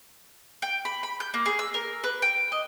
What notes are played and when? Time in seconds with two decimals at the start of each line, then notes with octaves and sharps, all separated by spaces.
0.62 G5
0.85 B5
1.03 B5
1.20 G6
1.34 A#3
1.46 G#4
1.59 E6
1.74 A#4
2.04 B4
2.22 G5
2.52 D#5